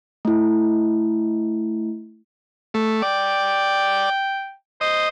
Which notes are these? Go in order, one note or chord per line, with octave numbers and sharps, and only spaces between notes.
A3 E4
A3
D5 G5
C5 D#5